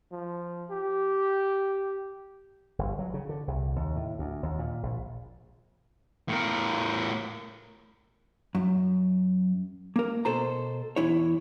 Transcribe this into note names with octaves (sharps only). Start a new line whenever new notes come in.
F3
G4
G1
F#3
C#3
D3
C2
D#2
A2
D2
D#2
A#2
A#1
A2 A#4
F#2
A#3 A#4
B2 A4 C5 A#5
E2 E4 C#5